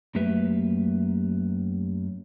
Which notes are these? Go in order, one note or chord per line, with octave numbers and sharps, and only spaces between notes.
F#2 A3 A#3 G4 B4 E5